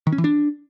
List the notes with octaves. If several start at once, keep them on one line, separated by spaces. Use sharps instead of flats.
D#3
C#4
E3
D4